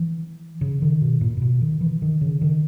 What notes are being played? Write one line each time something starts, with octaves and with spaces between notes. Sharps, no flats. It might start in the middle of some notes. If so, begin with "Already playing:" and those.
Already playing: E3
C#3
D#3
B2
A#2
A#2
B2
D#3
E3
D#3
C#3
D#3